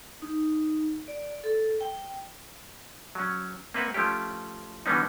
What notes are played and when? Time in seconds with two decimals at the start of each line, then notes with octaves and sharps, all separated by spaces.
0.22 D#4
1.08 D5
1.44 A4
1.81 G5
3.15 F#3 C#4
3.74 A#3 C4 B4 E5 F#5
3.94 F3 A3 C#4 G4
4.86 D3 E3 G3 B3 C#4 D#4